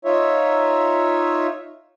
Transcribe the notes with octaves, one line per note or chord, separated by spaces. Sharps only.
D#4 F4 C#5 E5